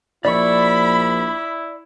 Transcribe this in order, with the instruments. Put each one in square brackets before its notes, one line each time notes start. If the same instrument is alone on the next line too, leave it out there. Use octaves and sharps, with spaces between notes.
[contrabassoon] A#1 [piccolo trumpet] E4 [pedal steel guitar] D5 C#6 [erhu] B5